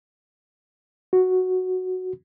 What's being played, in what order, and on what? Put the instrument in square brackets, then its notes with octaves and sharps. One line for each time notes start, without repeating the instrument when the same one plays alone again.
[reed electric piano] F#4